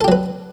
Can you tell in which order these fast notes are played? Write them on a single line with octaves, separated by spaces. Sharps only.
A4 G4 F#3 B4